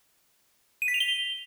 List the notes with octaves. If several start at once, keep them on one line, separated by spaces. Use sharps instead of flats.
D#7
B6
F7
G7